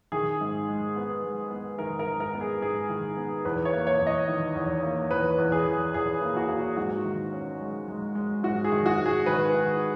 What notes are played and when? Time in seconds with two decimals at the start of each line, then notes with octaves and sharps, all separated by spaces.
0.12 D#3 G#4
0.41 G#2
0.68 G#3
0.96 B3
1.24 G#3
1.50 B3
1.78 D#3 A#4
1.99 A#4
2.07 G#2
2.20 A#4
2.34 B3
2.41 G#4
2.62 G#2 G#4
2.89 D#3
3.17 B3
3.45 E2 B4
3.65 C#5
3.73 A#3
3.87 C#5
4.01 E2
4.07 D#5
4.29 D#3
4.55 E2
4.83 A#3
5.11 E2 B4
5.38 E2
5.52 G#4
5.67 E2
5.94 E2 G#4
6.22 A#3
6.36 F#4
6.49 A#3
6.77 G#2 F#4
7.04 D#3
7.32 C#4
7.61 G#3
7.88 G#3
8.15 G#3
8.43 G#2 F#4
8.65 G#4
8.72 D#3
8.86 F#4
8.99 G#2
9.06 G#4
9.26 D#3 B4
9.54 D#3